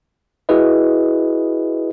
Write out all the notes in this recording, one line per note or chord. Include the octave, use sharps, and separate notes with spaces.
E4 F#4 G#4 B4 D#5